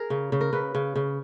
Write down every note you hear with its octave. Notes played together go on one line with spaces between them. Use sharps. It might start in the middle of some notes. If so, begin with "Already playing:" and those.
Already playing: G#4 A#4
C#3
C#3
A#4
C#3 B4
C#3
C#3